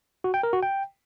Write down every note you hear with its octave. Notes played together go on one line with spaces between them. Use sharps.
F#4
G5
A#4
F#4
G5